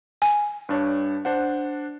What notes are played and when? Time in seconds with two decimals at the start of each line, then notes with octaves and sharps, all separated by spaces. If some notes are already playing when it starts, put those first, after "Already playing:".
0.22 G#5
0.69 G2 D4 C#5
1.25 D4 C5 F#5